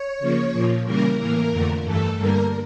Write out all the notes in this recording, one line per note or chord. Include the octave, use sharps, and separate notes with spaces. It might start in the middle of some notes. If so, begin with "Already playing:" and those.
Already playing: C#5
C#3 F3 A#3
A#2 F3 A#3
C#3 E3 G3 A#3 A#4
A2 E3 A#3 A#4
F2 D3 A3
G2 E3 A3 A4
G2 D3 G3 A#3 A#4